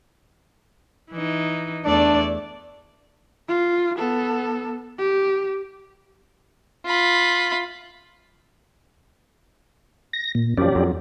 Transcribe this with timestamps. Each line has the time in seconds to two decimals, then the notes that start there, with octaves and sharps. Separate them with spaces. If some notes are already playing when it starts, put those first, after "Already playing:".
1.12 E3 D#4
1.85 E2 A3 D4 D5
3.49 F4
3.97 B3 A4
4.98 G4
6.86 F4 B5
10.13 A#6
10.35 A#2
10.57 F#2 F3 C#4 G4 D5
10.72 F2 F#3